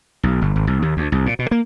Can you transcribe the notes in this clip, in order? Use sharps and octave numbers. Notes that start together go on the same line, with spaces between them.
B1
G1
G#1
C2
D#2
D2
C2
A#2
B2
A#3